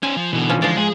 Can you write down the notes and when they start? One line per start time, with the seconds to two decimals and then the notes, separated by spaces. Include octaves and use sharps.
0.03 C#4 C5 G#5
0.17 F3
0.33 B2 D3 E3
0.49 F3 C#4
0.62 F3 G#3 D5
0.77 G#3 G#4 C5